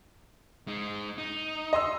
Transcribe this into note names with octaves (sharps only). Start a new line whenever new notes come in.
G#3 D#4
D#4
D#5 C6 E6